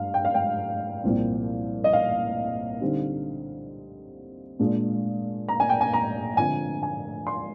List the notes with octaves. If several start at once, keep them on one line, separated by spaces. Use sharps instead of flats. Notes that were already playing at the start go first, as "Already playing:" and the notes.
Already playing: G2 F5
G5
F5
G5
C2 A#2 F3 C4
D#5
F5
D3 G3 C4 D#4
A#2 G#3 D4 F4
A#5
G#5
G5
G#5
A#5
D3 F3 C4 G#5
G#5
C6